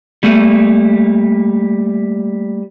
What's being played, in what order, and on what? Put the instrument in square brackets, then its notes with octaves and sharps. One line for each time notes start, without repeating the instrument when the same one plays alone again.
[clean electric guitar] G3 A3 A#3